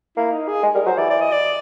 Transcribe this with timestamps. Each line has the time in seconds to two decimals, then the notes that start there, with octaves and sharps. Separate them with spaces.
0.17 A#3 E4
0.32 D#4
0.48 G#4
0.63 G#3
0.75 G3 A#4
0.86 F#3 C5
0.97 E3 D5
1.10 D5
1.20 D#5
1.32 D5